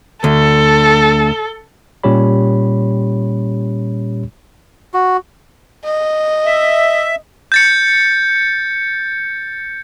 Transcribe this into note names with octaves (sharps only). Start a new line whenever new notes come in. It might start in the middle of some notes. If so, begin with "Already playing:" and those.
D2 A4
A#2 G3 C#4 G4 C#5 B5
F#4
D#5
E5
G6 A6 C#7